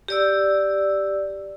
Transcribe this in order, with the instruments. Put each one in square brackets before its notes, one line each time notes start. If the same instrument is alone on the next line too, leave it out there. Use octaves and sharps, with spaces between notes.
[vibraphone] G4 D5 E6